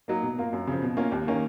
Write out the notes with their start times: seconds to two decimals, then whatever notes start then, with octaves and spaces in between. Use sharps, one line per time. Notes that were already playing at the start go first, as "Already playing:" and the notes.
0.08 F#3 A#3 D#4
0.23 B2
0.39 A#3 F4
0.53 F#2
0.67 C#3 F3
0.82 B2
0.97 A#3 C#4 F4
1.12 D#2
1.27 D#3 A#3 C#4